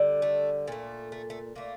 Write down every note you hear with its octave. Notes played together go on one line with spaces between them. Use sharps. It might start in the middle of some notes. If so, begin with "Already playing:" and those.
Already playing: D3 G3
A3
A#2 A3
A3
A3
A#2 A3 A#3